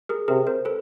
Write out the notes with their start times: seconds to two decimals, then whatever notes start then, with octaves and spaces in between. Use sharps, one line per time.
0.09 G#4 A#4
0.28 C3 G#4 A#4
0.47 A#4 C5
0.65 A4 B4